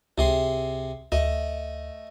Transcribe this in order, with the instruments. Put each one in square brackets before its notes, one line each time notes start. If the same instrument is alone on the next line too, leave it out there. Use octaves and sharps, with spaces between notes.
[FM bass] C#2 [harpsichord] C3 G#4 C6
[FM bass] D2 [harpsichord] A3 D#5